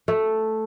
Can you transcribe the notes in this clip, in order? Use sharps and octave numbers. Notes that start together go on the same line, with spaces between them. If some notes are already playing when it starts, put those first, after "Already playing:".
A3